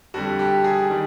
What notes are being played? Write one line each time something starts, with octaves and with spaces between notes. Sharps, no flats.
F2 D3 G3 F#4
G4
G#4
D#3 G3